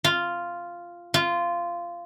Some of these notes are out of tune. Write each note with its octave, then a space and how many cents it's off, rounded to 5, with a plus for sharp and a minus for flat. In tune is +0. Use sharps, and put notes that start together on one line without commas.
F4 -5
F4 -15